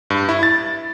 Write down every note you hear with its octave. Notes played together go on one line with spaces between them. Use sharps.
G2
E4
A6